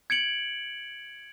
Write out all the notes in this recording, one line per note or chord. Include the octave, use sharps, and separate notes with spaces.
G#6 C#7 D7 F#7